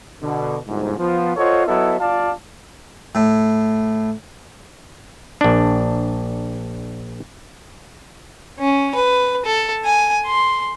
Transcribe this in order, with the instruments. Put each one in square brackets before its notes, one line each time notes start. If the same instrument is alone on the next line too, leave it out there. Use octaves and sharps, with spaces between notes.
[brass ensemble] B2 D3
G1 C2 F2 G#2
F3 B3 F4
F4 A4 C5 C#5 D#5 F#5
F#3 B3 E4 A4 D#5 E5
G1 F4 D5 F5 A5
[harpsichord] A2
[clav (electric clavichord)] A#1 D4
[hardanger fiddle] C#4
B4
A4
G#5
C6